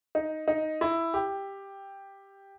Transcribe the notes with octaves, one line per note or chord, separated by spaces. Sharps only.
D#4
D#4
E4
G4